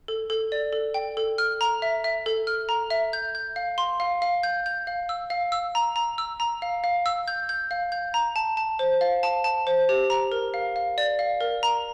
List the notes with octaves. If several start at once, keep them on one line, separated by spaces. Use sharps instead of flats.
A4
A4
D5
A4
G5
A4
F6
A#5
E5
E5
A4
F6
A#5
E5
G6
G6
F5
C6
F5
F5
G6
G6
F5
E6
F5
E6
A#5
A#5
E6
A#5
F5
F5
E6
G6
G6
F5
G6
A#5
A5
A5
C5
F5
A5
A5
C5
G4
A#5
A#4
F5
F5
D5
F5
A#4
A#5